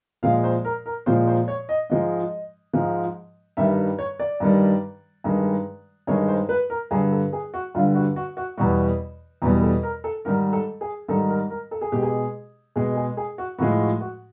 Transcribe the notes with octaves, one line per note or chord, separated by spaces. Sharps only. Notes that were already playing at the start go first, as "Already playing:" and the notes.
A#2 F3 G#3 F5
C5
A#4
A#4
A#2 F3 G#3 C5
C5
C#5
D#5
G#2 F3 G#3 D#5
G#2 F3 G#3
G2 D#3 G3 E5
C#5
D5
G2 D#3 G3
G2 D#3 G#3
G2 D#3 G#3 C#5
C5
B4
A#4
G2 D3 G3 G#4
A4
G#4
F#4
G2 D3 G3 F4
F#4
F#4
F#4
E2 B2 G3 F#4
E2 B2 G3
A4
A#4
A4
G#2 D#3 G3 A#4
A4
G#4
G#2 D#3 G3 A4
A#4
A#4
A4
G#4
B2 G#3 G4
G#4
B2 G#3 G#4
G#4
G#4
F#4
A2 F3 G#3 F#4
F#4
F#4